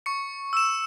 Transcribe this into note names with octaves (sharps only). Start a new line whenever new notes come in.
C#6 C#7
E6 E7